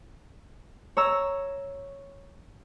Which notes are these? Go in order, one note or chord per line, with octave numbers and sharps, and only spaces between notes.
C#5 A#5 E6